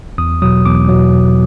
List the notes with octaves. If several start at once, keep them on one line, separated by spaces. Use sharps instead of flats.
E2 D#6
B2 F#3 D#6
E2 D6
B2 F#3